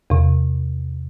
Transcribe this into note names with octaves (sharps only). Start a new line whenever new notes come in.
E2 C3